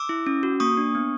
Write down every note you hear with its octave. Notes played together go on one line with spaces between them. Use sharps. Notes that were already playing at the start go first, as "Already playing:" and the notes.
Already playing: D6 E6
E4
C#4
F#4
A#3 C#6 D#6
D4
B3